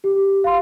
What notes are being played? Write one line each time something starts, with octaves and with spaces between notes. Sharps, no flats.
G4
F5 C6